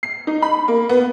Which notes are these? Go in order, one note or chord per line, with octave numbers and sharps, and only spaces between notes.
C7
D#4
B5
A#3
B3